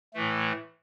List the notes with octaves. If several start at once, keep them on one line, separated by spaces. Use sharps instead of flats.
A2 E3 A3